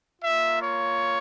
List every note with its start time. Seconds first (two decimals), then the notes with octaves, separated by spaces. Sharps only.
0.21 A#3 F4 E5
0.62 C#5